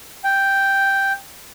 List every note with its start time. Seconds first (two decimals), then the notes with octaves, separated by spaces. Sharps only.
0.24 G5